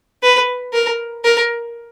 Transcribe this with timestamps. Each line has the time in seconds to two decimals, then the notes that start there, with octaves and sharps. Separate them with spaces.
0.23 B4
0.73 A#4
1.24 A#4